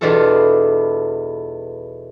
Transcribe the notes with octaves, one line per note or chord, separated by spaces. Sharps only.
E2 B2 D4 F4 A4